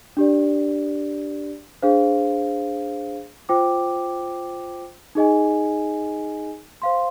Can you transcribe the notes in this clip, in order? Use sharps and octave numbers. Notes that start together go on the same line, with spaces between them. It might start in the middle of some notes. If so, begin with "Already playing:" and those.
D4 G4 D5
D4 G#4 C5 F5
F4 C5 G5 D6
D#4 G#4 D#5 G#5
C5 F5 C6